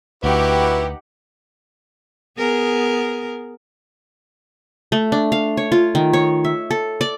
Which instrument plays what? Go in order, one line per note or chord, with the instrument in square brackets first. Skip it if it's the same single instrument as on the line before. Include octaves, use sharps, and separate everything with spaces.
[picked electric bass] D2 [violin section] D#4 G4 F#5 [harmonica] E4 F#4 [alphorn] B4
[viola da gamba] B3 G#4 A#4
[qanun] A3
D4
F5
C#5
F4
D#3
C#5
E5
A4
D5